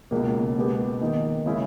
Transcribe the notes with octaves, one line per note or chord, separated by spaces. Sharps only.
C#2 B2 A#3
B2 G#3 B3 G4
D#3 A#3 D#4
C#3 G#3 C#4 E4